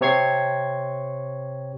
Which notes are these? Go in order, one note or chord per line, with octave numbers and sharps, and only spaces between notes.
C3 C4 C#5 C#6 G#6 C7